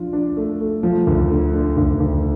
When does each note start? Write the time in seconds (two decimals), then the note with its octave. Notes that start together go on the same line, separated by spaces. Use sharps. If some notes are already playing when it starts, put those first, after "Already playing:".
Already playing: F3 D4 F4
0.13 D4
0.37 A3
0.60 A3
0.83 F3
1.07 D2
1.30 D3
1.53 D3
1.77 D2
2.00 D2